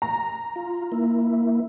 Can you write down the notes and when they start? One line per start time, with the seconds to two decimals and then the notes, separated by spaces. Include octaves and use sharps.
0.02 A#5
0.56 F4
0.92 A#3 E4